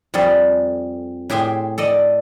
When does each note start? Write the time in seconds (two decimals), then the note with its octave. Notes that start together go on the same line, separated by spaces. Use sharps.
0.14 F2 G3 G#4 A4
1.30 A2 G4 G#4 E5 C6
1.78 A4 D5 D#5